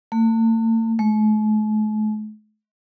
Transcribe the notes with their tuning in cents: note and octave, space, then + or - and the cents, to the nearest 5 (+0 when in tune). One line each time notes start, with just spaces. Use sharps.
A3 +45
A3 -45